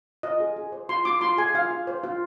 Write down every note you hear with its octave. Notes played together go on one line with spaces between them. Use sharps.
F4 D#5
G#4
G#4
C5
F4 C6
F4 D6
F4 C6
G#4 G#5
F4 F5
F4
C5
F4